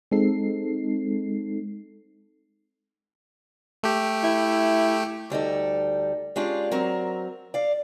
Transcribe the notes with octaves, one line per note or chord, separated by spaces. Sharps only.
G#3 C4 D#4 A4 C7
A3 G4
E4
D2 G3 D#4 A4
G#3 C#4 D4 F4 G4 G#4
F#3 C4 A#4
D5 F5